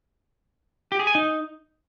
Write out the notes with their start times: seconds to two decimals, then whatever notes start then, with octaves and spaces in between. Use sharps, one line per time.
0.92 G4
0.99 G#4
1.07 G#5
1.15 D#4